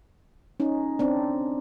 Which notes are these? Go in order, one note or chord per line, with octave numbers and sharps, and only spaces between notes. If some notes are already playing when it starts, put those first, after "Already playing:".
C#4 D#4
C4 D4